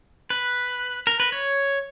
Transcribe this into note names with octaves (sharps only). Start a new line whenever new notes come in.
B4
A#4
B4
C#5